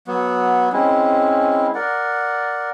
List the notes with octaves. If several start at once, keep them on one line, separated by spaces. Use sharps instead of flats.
F#3 B3
G#3 C4 C#4 E4
A#4 D5 F#5